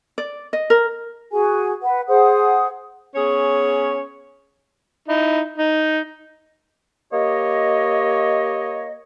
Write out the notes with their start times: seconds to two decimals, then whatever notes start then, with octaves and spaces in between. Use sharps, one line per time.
0.18 D5
0.53 D#5
0.70 A#4
1.31 F#4 G#4 G#5
1.82 B4 F#5
2.08 G#4 C5 F#5 D#6
3.15 B3 C#4 G#4 C#5
5.08 D#4 E4
5.58 D#4
7.11 A#3 G4 C#5 D#5